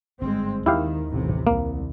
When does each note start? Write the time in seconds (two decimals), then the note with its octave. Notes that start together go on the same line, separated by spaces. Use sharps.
0.21 G1 G#2 G3 G#3 C4
0.66 D#2 D#3 E4 G4 F5
1.12 A1 C3
1.47 C2 A#3